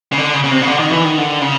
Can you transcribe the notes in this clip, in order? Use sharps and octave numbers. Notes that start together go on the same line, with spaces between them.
C#3
D3
C#3
C#3
C3
C#3
D3
D#3
E3
D#3
D3
C#3